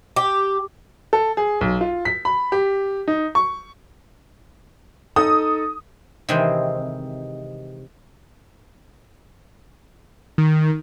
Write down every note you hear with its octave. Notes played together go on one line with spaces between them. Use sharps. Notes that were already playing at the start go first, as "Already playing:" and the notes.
G4
A4
G#4
B1
F4
B6
B5
G4
D#4
C#6
D#4 A4 D#6
C3 D#3 E3 G#3 C4
D#3